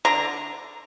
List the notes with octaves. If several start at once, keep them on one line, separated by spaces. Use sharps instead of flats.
D3 A#5